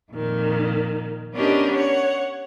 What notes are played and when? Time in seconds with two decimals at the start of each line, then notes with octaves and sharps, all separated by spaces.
0.13 F2 A#2 D#3
1.34 B3 C#4 D4 G4 A#4 D#5
1.75 C#5 F#5